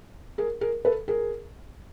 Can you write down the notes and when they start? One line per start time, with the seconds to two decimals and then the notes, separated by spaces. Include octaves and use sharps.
0.38 G#4 A#4
0.61 G#4 A#4
0.85 A4 B4
1.08 G#4 A#4